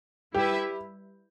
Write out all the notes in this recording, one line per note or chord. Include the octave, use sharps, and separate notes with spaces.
G3 E4 G4 B4 E5